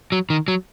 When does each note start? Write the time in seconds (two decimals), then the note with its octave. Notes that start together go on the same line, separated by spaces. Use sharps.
0.12 F#3
0.30 D#3
0.48 F#3